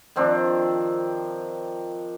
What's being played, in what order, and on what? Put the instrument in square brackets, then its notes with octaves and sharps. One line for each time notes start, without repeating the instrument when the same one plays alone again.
[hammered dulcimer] D#3 F3 C4 D4